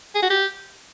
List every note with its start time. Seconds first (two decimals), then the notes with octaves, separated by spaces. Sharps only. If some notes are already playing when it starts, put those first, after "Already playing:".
0.15 G#4
0.23 F#4
0.30 G4